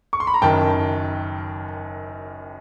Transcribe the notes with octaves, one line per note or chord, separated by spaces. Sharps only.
C#6
C6
B5
A#5
F#1 F#2 D#3 G5 A5